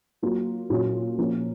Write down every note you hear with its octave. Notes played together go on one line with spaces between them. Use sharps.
F#3 A#3 F4
A#2 F#3 C#4 F4
F3 A#3 C#4